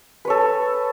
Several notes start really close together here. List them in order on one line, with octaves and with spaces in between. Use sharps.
B4 C#5 A4